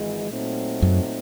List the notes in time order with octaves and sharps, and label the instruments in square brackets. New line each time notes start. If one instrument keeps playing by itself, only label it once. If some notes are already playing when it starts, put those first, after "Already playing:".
Already playing: [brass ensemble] G#1 G#2 E3 G#3
A#2 F#3 A3 C4 D#4
[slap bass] F#2